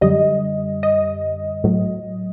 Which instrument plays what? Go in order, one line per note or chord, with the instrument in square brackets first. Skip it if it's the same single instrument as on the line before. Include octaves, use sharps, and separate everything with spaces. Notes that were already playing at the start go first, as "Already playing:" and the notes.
[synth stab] F#2 D3 G3 D#5
D#5
A2 F#3